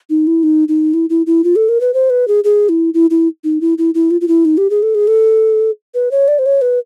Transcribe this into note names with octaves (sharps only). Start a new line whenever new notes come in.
D#4
E4
D#4
D#4
E4
E4
E4
F4
A4
A#4
B4
C5
B4
G#4
G#4
E4
E4
E4
D#4
E4
E4
E4
F4
F4
E4
D#4
G4
G#4
A4
G#4
A4
B4
C#5
D5
C5
C#5
B4